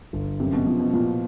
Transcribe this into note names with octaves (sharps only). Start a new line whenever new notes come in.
G1
F#2 C3
B2
B2 F3
B2
A#2 F3